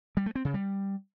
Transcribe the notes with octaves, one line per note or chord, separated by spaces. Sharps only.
G3
A3
C4
C#3
G3